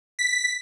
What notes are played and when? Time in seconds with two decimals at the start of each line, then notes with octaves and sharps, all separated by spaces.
0.19 B6